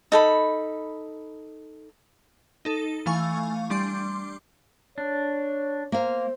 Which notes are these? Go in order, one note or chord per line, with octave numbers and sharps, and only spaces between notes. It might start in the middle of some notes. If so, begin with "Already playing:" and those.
D#4 A4 B5
D#4 A4
E3 A3 F5 G#5 C#6
G3 D4 C6 D6
D4 C#5
A#3 C5 F5